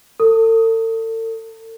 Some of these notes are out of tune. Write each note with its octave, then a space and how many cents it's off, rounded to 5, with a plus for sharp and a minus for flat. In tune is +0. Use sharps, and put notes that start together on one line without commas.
A4 +40